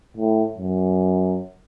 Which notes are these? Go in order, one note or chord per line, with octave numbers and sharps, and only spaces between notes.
A2
F#2